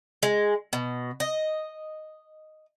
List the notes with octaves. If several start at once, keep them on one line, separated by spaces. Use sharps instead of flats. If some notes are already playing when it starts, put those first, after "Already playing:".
G#3
B2
D#5